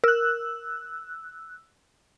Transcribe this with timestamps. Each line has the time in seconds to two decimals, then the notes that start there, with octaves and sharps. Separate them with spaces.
0.04 A#4 E6 F#6